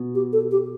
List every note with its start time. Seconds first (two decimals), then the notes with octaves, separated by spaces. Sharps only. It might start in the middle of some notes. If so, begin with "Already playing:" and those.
Already playing: B2
0.15 G4
0.33 A4
0.51 G4